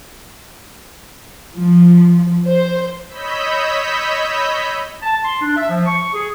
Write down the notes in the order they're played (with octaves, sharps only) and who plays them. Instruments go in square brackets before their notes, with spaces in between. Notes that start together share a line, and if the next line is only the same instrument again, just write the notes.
[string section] F3
C5
[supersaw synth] C#5 D#5 B5 E6 G6 B6
[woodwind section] A5
C6
D4
E5
F3
C#6
G#4